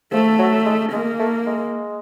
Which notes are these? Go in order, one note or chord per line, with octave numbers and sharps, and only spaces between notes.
F3 A3
F#3
G#3
G#3 A#3
A3
G#3